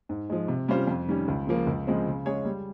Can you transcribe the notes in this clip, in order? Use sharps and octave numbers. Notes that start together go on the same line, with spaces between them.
G#2
F3 G#3
C3
G3 C#4 F4 C5
F2
D#3 G3 C#4
C#2
C#3 F3 A#3
C#2
C#3 F3 G#3 C4
C#3
G#3 C#4 G#4 C#5
G3